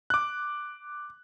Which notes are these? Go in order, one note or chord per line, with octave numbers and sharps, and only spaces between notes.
D6 F#6